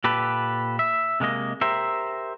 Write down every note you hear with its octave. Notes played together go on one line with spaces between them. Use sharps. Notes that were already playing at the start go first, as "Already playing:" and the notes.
A#2 G4 A4 B4
E5
C3 G#3 A#3 D#5
G4 A#4 C5 E5